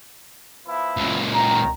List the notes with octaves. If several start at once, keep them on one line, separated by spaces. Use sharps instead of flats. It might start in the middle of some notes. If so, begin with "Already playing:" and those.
F3 B3 E4
C#2 A#2
C2 D#3 A#5